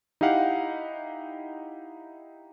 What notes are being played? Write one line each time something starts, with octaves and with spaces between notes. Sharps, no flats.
D#4 E4 G4 F5 F#5